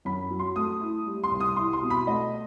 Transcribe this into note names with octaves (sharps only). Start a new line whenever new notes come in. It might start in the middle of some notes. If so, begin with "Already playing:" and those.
F#2 B5
F#3
C6
A3 D#6
E4
G3
C6
C2
D#6
E4 C6
C6
B2
B5
A3 D#5